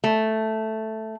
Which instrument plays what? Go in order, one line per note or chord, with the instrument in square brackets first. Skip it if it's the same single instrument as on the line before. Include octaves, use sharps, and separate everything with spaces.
[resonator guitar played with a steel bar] A3